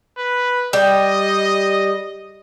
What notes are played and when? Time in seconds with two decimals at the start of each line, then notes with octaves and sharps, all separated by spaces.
0.18 B4
0.73 G3 D#5